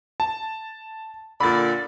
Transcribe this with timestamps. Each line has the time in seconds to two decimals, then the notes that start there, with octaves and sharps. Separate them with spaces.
0.20 A5
1.40 A#2 D3 D5 B5 A6